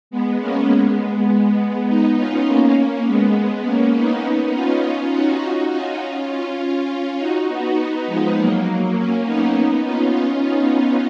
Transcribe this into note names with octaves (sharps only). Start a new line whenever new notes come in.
G#3 B3
A#3 C#4
G#3 B3
G#3 B3
B3 D#4
C#4 F4
A#3 C#4
G#3 B3
G#3 B3
A#3 C#4
B3 D#4
C#4 F4
D#4 F#4
C#4 F4
C#4 F4
C#4 F4
C#4 F4
D#4 F#4
B3 D#4
F3 G#3
F#3 A#3
A#3 C#4
B3 D#4
B3 D#4
C#4 F4
C#4 F4
B3 D#4